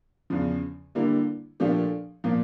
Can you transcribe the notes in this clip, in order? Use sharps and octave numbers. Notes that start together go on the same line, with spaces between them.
E2 C#3 F3
D3 G3 A#3 E4
A#2 F3 A3 D4 G4
A#2 F3 A#3